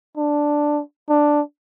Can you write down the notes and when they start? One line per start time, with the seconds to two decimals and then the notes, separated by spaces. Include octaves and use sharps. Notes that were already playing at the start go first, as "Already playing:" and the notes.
0.17 D4
1.09 D4